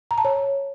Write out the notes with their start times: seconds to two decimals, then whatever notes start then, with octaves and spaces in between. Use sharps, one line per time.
0.11 A#5
0.18 A5
0.25 C#5